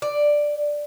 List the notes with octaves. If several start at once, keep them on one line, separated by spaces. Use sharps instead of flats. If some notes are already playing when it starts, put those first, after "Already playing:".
D5